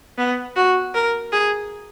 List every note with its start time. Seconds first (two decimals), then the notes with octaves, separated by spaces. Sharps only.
0.18 B3
0.56 F#4
0.95 A#4
1.32 G#4